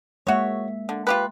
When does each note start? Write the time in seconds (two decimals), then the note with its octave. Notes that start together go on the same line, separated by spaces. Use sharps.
0.27 G#3 A#3 F#4 C#5 E5
0.89 D3
1.07 F4 G4 B4